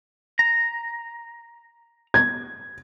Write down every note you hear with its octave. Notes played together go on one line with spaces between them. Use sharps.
A#5
G#6